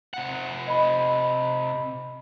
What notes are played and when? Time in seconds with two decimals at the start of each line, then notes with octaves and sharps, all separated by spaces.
0.14 C3 F#5
0.67 D#5 B5